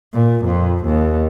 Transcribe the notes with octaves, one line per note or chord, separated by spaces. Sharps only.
A#2
F2
D#2